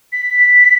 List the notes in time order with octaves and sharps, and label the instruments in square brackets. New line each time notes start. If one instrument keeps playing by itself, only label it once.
[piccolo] B6